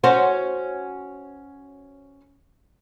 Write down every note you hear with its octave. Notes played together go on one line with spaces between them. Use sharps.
C#4 F#4 C5